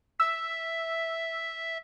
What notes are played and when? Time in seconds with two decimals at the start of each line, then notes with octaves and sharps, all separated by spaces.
0.20 E5 E6